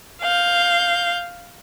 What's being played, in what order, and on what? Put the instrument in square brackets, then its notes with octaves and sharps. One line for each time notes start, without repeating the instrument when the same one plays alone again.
[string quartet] F5 G6